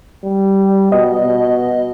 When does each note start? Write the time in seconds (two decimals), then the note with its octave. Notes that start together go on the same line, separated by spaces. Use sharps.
0.24 G3
0.92 B2 D#5
1.23 B2